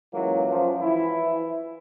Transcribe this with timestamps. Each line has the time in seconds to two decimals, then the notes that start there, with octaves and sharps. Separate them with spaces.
0.12 C#2 E3 F#3 A#3
0.49 F#2 F3
0.81 E3 E4